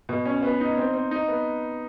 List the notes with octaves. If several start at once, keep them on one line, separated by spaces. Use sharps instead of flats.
B2
C#4
B3
D#4
C4
C4
D#4
B3